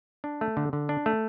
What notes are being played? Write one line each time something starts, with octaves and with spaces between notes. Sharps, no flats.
D4
A3
D3
D3
D4
A3